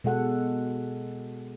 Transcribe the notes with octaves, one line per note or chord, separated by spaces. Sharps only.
B2 G#3 A4 F#5